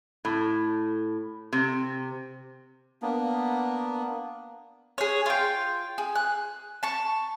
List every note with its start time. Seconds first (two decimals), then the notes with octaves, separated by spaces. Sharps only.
0.25 A2
1.53 C3
3.02 A#3 B3 D4
4.98 G#4 C#5
5.26 F4 G5
5.98 G#4
6.15 F#6
6.83 A5 C#6